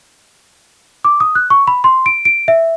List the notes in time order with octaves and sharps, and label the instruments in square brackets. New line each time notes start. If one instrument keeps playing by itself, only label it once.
[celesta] D6
D#6
F#6
C#6
B5
C6
D7
D7
E5